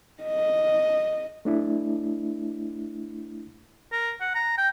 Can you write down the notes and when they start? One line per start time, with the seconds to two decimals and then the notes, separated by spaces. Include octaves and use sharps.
0.23 D#5
1.45 A3 D4 E4
3.92 A#4
4.21 F#5
4.35 A#5
4.58 G5